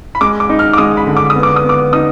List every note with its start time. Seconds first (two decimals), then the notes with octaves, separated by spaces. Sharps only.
0.15 B5
0.21 G#3 D6
0.40 D6
0.49 D#4
0.59 F6
0.73 D6
0.78 G#3 D#6
0.97 B5
1.07 D3
1.17 D6
1.30 D#6
1.36 B3
1.43 D6
1.56 D#6
1.64 B3
1.69 D6
1.93 D#4 D#6